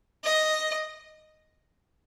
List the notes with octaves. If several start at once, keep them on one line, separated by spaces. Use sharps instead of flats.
D#5